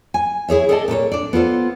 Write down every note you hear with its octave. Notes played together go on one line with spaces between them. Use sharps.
G#5
E4 G#4 C#5 E5
G#4 A4 D5 D#5 F5 A5
A#2 A4 B4 C#5
D4 D5
B3 F4 A4 C5